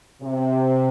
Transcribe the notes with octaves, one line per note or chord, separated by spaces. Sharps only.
C3